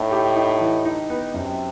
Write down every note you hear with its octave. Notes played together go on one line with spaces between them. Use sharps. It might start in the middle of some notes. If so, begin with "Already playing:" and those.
Already playing: A2 D#4
G4
D#4
E3
D#4
B3
F#2 C3